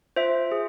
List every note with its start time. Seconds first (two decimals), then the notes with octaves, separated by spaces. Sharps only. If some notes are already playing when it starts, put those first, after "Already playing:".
0.16 F4 C5 E5
0.52 G#4